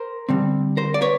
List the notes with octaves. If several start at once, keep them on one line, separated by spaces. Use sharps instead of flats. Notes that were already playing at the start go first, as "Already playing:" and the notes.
Already playing: A#4 C5
D3 G3 C4
A#4 C5
D5
B4 C#5